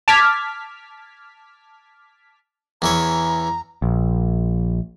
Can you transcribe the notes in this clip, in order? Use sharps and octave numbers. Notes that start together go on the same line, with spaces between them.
A5 D6 F6 G#6 B6
E2 E3 C#5 A#5
A#1